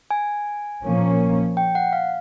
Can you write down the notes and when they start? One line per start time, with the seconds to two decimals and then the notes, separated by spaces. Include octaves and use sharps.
0.11 G#5
0.84 A#2 F3 A#3 C#4
1.57 G5
1.75 F#5
1.93 F5